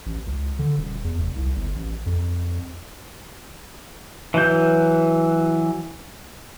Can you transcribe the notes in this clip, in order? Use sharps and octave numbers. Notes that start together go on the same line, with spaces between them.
A1
C#2
D3
D#1
E2
F1
C2
G1
A1
F2
E3 F#3 G6